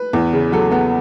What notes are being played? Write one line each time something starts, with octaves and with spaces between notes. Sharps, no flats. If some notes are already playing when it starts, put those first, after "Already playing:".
Already playing: B4
E2
C#3
F#3 A4
B3